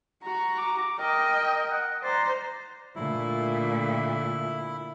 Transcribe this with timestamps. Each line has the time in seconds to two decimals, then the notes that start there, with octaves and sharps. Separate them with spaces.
0.23 F#4 A#5
0.58 D6
0.99 A#4 D#5 G5
1.71 F#5
2.03 C5 D5 A#5
2.96 A#2 D3 A3 E4